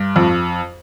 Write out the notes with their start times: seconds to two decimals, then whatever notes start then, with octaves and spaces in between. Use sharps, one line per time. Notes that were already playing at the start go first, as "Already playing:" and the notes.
Already playing: G2
0.16 F2